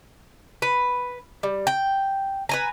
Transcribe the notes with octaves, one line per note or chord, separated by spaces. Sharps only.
B4
G3
G5
B4 G#5 A#5